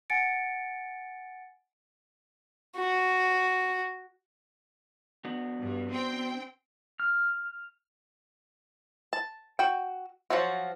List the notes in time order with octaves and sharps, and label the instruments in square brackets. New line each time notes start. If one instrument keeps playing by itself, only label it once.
[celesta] F#5 G#5 A6 C#7 D7
[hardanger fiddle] F#4
[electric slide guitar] B3 D4 F#4
[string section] G2
C4 G5
[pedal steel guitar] F6
[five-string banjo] A5
F#4 G5
F3 F#3 F4 F#4